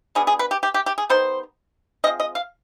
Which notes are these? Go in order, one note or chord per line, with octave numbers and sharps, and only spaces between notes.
B2 B3 D4 G#4
G#4
B4
G4
G4
G4
G4
G#4
D#3 G3 B3 D#4 C5
F3 G#3 C4 D#5
D#5
F5